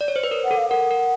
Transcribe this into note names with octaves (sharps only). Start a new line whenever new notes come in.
D5
C#5
C5
B4
A#4
F#5
A4
F5
A#4 F#5
A#4